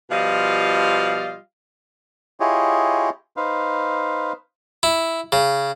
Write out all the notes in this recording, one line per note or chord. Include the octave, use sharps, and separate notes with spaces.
B2 F3 G3 F4 D#5 F5
E4 F4 G4 G#4 C#5 D#5
D#4 B4 C5 F5
E4
C#3